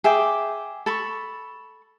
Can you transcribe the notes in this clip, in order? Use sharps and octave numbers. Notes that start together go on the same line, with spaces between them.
G#4 E5 G5 D6
A4 B5 C#6